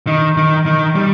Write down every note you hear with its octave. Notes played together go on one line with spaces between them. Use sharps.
D#3
D#3
D#3
G3